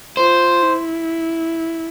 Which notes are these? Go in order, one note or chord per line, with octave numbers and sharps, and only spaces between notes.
F4 C5
E4